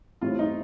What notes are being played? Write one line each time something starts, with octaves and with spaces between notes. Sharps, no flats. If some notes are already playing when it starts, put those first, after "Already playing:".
A2 G3 C4 F4
D#4